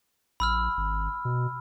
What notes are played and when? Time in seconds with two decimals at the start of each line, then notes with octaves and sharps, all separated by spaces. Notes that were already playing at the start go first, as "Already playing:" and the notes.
0.40 A#1 B5 E6 F6
0.77 G#1
1.25 B2